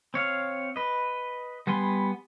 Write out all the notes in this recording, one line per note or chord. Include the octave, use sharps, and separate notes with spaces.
C4 C#5 F5
B4 D#5
G3 B3 G#5 C6